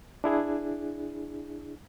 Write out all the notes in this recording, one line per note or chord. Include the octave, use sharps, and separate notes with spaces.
D4 E4 G#4